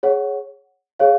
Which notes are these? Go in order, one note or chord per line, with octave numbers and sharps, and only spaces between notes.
G#4 C#5 F#5
G#4 C#5 F5